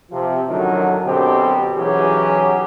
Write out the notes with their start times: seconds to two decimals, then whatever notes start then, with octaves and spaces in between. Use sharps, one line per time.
0.11 C3 F3
0.49 F#2 A2 D3 D#3 F#3
1.06 F#2 B2 D3 C4 G4
1.77 B1 E3 F#3 C#4 G4 G#4